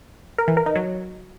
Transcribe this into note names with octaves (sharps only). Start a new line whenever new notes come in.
A#4
E3
A#4
D#4
F#3